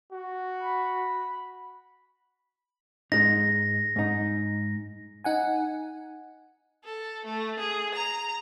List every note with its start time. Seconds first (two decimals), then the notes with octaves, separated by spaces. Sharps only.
0.12 F#4
0.61 B5
3.12 G#2 G#3 D#4 A#6
3.96 G#2 D#4
5.24 D#4 F#5 G#5
6.84 A4
7.26 A3
7.60 G#4
7.95 A#5